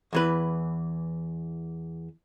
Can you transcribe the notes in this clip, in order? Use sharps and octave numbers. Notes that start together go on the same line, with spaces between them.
E2 E3 B4